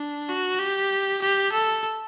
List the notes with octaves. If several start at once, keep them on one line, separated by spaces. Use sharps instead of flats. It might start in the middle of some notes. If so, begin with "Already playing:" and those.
Already playing: D4
F#4
G4
G4
A4